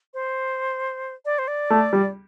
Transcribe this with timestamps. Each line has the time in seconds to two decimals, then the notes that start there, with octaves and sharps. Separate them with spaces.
0.14 C5
1.25 D5
1.39 C5
1.48 D5
1.70 A3
1.93 G3